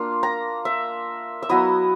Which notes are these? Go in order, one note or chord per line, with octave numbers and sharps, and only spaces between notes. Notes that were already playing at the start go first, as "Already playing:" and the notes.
Already playing: A#3 D4 F4
A#5
E5
E5
F#3 B3 E4 D#5